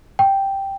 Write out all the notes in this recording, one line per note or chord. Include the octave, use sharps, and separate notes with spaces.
G5